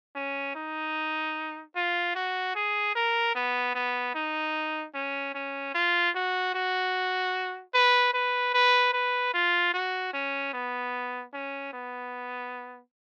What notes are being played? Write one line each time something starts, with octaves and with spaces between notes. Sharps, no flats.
C#4
D#4
F4
F#4
G#4
A#4
B3
B3
D#4
C#4
C#4
F4
F#4
F#4
B4
B4
B4
B4
F4
F#4
C#4
B3
C#4
B3